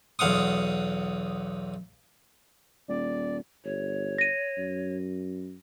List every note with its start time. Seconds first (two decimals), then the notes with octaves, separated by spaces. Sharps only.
0.19 B1 E2 F5 F#5 D#6
2.88 D#1 D5
3.64 G1 C#5
4.18 A#6 D#7
4.58 F#2